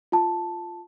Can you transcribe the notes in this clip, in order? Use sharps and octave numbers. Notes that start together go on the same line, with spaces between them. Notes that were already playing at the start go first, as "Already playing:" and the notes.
F4 A5